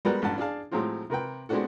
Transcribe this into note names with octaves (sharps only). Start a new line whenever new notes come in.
G3 G#3 B3 F#4 A#4 B4
A1 G2 F#5 A5
D4 G#4 F5 A5
A2 F3 F#3 G#3 C4 F4
C3 A#4 B4 G5
G#3 B3 C4 D4 F#4 A4